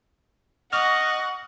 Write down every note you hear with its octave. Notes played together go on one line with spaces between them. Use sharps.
D#5 F#5 C#6 F6